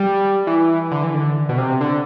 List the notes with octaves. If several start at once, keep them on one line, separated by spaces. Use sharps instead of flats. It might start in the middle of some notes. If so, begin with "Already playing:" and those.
Already playing: G3
E3
D3
E3
D3
B2
C3
D3